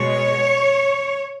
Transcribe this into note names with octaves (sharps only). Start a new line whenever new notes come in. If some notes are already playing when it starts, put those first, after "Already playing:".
Already playing: B2 G#3 C#5